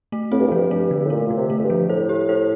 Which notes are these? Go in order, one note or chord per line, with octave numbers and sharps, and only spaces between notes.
A3
A2 C4
G2
F2
G2 F3
G2 A3
D3
A2
A#2 A3
A#2 D3
C3
A3
F2
G2
F3
A2 C5
G4
A2 C5